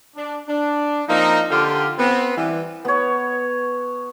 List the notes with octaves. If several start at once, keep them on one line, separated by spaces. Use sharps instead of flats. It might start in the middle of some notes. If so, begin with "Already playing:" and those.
D4
D4
F3 A#3 C4 D#4
D3 F4 G4
B3 C4
E3 G3
B3 C#5